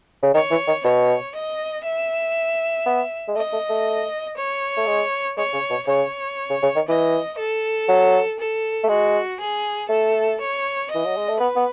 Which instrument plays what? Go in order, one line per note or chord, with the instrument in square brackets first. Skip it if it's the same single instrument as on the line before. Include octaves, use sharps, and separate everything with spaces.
[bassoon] C#3
[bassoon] D#3 [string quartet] C#5
[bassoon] E3
D#3
[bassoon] B2 [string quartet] C#5
[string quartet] D#5
E5
[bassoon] B3
G#3
[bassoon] A3 [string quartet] D#5
[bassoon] A3
A3
[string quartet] C#5
[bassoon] A3
G#3
[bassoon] G#3 [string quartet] C#5
[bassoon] C#3
B2
[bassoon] C#3 [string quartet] C#5
[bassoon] C#3
C#3
D#3
[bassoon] E3 [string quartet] D#5
[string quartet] A4
[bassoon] F#3
[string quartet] A4
[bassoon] A3
[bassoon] G#3 [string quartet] F#4
[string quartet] G#4
[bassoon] A3 [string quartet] A4
[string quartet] C#5
[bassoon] E3 [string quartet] D#5
[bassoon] F#3
G#3
A3
[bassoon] B3 [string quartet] B4
[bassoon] B3